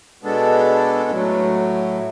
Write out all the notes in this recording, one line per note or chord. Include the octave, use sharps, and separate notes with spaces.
B2 G#3 B3 D4 A4
A2 F#3 A3